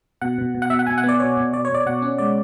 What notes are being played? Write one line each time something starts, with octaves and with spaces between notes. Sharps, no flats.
B2 F#5
B2
B2
F#5
B2 E5
F#5
B2 G#5
F#5
B3 D5
B2 C#5
B2
B2 D5
C#5
B2
D5
B2 F#5
C#4
G#3 D5